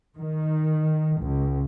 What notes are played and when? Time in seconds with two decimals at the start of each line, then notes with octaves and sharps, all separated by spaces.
0.16 D#3
1.20 C#2